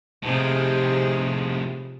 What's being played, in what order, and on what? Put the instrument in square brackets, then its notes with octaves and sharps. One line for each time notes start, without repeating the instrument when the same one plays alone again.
[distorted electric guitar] A2 F3 [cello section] C3 D#4 G#4